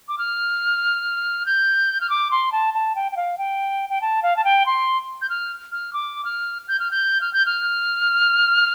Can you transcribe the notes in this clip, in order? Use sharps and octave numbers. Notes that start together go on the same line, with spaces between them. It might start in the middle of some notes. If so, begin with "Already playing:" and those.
D6
F6
G6
F6
D6
C6
A5
A5
G5
G5
F5
G5
G5
A5
F5
A5
G5
C6
G6
F6
F6
D6
F6
G6
F6
G6
F6
G6
F6